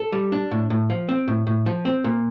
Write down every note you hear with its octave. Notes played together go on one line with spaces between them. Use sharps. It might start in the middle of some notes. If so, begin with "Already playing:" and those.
Already playing: A4
G3
D4
A2
A2
F3
C4
A2
A2
F3
C4
A#2